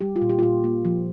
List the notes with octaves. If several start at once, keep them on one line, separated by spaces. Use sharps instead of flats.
G3 G4
F4
A#2
G4
F4
A#2 G4
A#3
F3